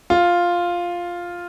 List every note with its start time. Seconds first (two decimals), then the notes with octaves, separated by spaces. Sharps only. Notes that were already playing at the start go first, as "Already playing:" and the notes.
0.10 F4